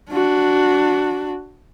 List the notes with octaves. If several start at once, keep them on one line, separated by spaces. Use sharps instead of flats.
D4 F#4